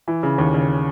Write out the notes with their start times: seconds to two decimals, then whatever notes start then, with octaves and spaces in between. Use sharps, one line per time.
0.08 E3
0.23 C#3
0.38 D#2
0.54 C#3